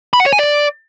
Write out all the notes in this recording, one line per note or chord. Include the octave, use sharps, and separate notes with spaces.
B5
F#5
C#5
G#5
D5